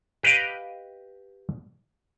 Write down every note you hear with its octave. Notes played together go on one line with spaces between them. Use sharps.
G4 B4 D#5 F5 G5